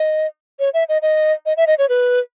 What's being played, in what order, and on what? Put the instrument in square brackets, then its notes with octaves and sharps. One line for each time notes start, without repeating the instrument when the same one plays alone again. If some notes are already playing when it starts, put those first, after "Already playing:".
Already playing: [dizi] D#5
C#5
E5
D#5
D#5
D#5
E5
D#5
C#5
B4